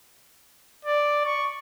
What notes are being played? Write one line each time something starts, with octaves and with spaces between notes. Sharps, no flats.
D5
C#6